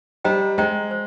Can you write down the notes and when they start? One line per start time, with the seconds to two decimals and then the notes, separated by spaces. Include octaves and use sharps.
0.25 G3 C5 D#5 G5 A#5
0.58 G#3 C5 D#5 G5 A#5
0.91 C5